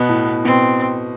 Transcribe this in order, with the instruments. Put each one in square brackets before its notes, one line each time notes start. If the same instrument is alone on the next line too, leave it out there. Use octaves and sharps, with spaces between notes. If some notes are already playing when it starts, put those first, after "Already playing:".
Already playing: [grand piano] B2 [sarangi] B3
[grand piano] A2
[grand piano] B2 [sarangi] C4